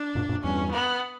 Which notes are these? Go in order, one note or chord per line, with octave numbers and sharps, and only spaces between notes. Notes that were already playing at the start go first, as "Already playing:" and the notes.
Already playing: D4
F#2 A#2
F#2 A#2
E2 G2 C#4
B3